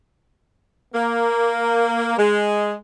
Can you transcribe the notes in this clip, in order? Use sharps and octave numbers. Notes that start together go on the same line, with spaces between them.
A#3
G#3